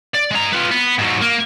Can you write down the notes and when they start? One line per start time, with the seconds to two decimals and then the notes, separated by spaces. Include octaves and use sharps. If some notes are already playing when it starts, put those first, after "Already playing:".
0.15 D5
0.31 G#3 A#5
0.53 F4 B4
0.71 B3
0.99 G#2 F#3
1.22 A#3